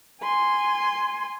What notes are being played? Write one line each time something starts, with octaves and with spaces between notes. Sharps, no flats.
G#5 C6